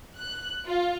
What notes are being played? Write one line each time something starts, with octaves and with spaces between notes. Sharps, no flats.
F#6
F4